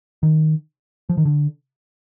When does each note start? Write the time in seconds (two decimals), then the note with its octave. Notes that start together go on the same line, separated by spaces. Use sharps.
0.23 D#3
1.09 F3
1.17 D#3
1.25 D3